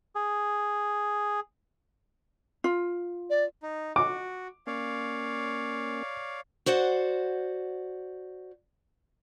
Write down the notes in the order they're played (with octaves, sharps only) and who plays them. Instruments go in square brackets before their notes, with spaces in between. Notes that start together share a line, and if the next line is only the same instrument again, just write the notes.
[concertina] G#4
[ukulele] F4
[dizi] D5
[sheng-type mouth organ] D#4
[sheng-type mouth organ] F#4 [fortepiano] D6
[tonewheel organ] A#3 C#4 [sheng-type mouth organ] C#5 D5 F5
[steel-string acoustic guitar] F#4 C5 D5 F#5